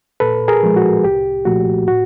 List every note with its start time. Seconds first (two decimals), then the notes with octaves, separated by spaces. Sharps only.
0.20 A#2 A4 B4
0.48 G#4 A#4
0.63 F3 G#3
0.76 F#4
1.04 C2 G4
1.45 A#2 F3 A3 F#4
1.87 A2 F#4